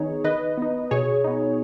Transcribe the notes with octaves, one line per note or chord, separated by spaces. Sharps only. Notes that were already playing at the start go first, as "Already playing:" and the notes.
Already playing: D#3 B3 D#4 G#4 C#5
D#3 B4 D#5
B3 D#4
B2 G#4 C#5
B3 D#4